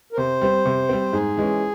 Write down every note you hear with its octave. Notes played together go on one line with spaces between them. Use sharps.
A#4
C3 C5
G3 C4
C3
G3 C4
G#2 G#4
E3 G#3 C#4